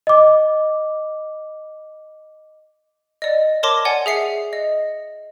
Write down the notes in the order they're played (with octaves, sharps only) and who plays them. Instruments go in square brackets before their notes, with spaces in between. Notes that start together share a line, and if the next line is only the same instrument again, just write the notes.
[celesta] D#5 D6
[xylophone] D5 D#5
A#4 C#5 A5 C6 D6 A#6
C#5 D5 F#5 G#5
G#4 E5 C7 C#7
D#5